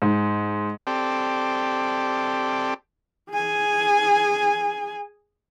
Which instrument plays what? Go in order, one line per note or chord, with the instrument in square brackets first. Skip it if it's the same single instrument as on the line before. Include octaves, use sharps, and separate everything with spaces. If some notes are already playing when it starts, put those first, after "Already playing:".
[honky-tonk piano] G#2
[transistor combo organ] C4 G4 A4 D5
[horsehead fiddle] G#4 G#5